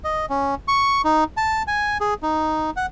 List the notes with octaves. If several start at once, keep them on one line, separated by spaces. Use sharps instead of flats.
D#5
C#4
C#6
D#4
A5
G#5
G#4
D#4
F#5